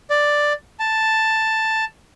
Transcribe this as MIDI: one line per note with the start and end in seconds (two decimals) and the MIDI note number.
0.10 0.53 74
0.80 1.84 81